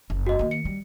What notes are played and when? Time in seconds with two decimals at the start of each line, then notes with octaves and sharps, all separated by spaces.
0.10 F#1
0.27 F#4 D#5
0.39 D#3 A#3
0.51 C#7
0.65 G3